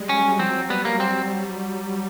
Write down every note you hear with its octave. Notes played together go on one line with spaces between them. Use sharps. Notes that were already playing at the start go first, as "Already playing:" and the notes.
Already playing: G3 G#3
F#3 C#4
F3 C4
F#3
F#3
G3 B3
A#3
C4